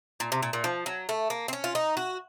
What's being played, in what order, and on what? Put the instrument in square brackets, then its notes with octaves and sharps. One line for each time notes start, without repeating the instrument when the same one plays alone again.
[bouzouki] A#2
C3
A#2
A#2
F3
F#3
A3
A#3
C4
C#4
F4
D#4
F#4